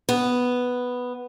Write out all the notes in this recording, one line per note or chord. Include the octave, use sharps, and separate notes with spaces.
B3